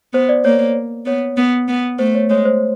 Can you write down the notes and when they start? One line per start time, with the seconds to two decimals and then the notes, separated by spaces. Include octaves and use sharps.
0.13 B3 C5
0.29 D5
0.45 A#3 C#5
1.06 B3 C#5
1.37 B3
1.68 B3
1.99 A3 C5
2.15 C#5
2.30 G#3 C#5
2.45 C5